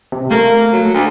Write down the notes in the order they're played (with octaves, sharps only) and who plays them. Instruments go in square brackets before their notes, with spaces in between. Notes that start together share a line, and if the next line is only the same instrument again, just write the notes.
[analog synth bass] C3
[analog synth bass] A3 [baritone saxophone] A#3
[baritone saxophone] F#3
D2